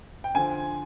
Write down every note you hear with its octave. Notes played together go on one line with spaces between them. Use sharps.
G5
D3 F3 G#5